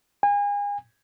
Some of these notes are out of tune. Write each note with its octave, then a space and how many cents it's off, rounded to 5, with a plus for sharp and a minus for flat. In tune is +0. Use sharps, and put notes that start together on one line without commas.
G#5 -35